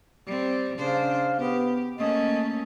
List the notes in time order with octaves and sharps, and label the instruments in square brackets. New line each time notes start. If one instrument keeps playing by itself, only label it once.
[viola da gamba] G3 C4
[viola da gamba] C#3 D4 C5 [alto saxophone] F5
[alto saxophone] B3 [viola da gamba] G4
[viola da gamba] A3 A#3 C#4 [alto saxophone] D#5